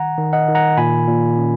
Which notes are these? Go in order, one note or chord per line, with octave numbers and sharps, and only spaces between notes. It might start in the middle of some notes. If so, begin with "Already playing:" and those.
Already playing: D#3 F#5 A#5
D#3
D#5 F#5
D#3
F#5 A#5
A#2 G#5 B5
A#2
C#4